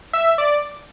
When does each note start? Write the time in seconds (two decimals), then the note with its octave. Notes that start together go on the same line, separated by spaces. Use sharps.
0.13 E5
0.38 D5